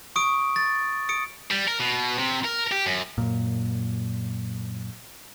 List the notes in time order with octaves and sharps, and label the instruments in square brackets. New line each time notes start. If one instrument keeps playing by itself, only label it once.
[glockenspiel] C#6 D#6 D7
A6
D#6 C#7 D7
[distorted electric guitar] G3
A#4
B2
C3
A#4
G4
F#2
[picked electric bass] F#2 A#2